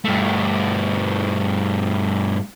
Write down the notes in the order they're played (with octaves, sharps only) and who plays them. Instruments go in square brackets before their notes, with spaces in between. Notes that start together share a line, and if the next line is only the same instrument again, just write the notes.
[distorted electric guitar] G2 A3